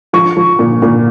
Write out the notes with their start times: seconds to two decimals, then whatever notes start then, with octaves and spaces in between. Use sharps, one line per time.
0.13 F3 C#6
0.37 F3
0.59 A#2
0.82 A#2